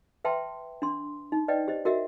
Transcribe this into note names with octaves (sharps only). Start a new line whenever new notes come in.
B4 E5 G5 A5 C6
D4 C6
D#4
B4 D5 D#5 G5
G4 C5 D#5
F#4 A#4 D#5 E5 F#5